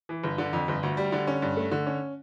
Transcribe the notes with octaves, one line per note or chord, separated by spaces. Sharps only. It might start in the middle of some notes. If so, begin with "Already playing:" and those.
E3
G1
D3
F2
G1
D2
G3
D3
C#4
G2
A3
D3
C#4